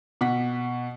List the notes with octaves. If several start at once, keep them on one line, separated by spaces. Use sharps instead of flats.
B2 F#5 B6